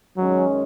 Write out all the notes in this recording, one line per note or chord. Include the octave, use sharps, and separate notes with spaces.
F#2 D#3 F#3 G#3 C#4